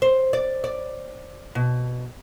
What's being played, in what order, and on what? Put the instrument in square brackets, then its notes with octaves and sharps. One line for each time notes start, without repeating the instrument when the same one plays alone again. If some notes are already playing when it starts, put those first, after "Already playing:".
[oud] C5
D5
D5
B2